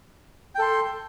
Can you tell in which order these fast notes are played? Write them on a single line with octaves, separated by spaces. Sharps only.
G5 A4 C6